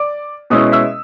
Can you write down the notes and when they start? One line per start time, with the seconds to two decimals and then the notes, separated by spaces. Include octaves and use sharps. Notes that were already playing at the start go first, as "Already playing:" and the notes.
Already playing: D5 D6
0.50 B2 G#3 C#4 E4 D#5 D#6
0.72 E5 E6